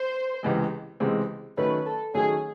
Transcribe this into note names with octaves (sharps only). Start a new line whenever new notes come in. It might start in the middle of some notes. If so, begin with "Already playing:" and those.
Already playing: C5
C#2 C3 E3 G#3 C4
C#2 C3 E3 G#3 C4
D#3 F#3 A3 C#4 B4
A4
D#3 F#3 A3 C#4 G#4